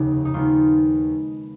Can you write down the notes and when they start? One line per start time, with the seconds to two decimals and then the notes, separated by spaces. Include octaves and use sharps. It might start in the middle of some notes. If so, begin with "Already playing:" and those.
Already playing: F1 D#2 C#3
0.25 D#4
0.34 D#2 D#3 G#3 B3 F4